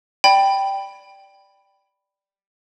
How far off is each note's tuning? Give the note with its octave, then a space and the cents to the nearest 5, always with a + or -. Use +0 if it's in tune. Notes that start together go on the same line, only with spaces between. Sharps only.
D5 +0 G5 +0 B5 +0